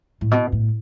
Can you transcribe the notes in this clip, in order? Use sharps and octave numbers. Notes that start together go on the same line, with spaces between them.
A2
B2
A2